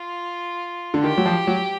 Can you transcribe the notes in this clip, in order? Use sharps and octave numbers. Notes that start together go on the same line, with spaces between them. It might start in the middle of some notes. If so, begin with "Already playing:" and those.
Already playing: F4
D3
D#3 G4
F#3
F3
F#3